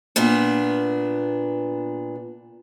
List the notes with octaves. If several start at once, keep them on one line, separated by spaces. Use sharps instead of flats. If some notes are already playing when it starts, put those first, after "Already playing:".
A#2 B3 D4